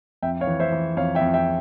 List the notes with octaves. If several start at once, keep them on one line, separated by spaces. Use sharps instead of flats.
F2 E5 G5
C#5 F5
E3
C5 E5
E3
F2 C#5 F5
E5 G5
F2
E5 G5